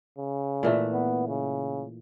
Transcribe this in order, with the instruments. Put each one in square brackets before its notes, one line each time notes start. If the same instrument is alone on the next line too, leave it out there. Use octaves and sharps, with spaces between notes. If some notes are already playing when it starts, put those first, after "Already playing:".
[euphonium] C#3
[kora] A#2 E3 A3
[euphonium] B3
C#3